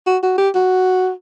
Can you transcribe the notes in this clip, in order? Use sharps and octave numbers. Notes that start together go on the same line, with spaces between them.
F#4
F#4
G4
F#4